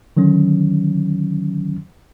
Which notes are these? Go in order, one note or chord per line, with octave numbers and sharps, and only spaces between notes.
D3 D#3 F#3 C#4